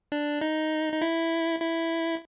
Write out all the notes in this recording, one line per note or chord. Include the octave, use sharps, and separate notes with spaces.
D4
D#4
D#4
E4
E4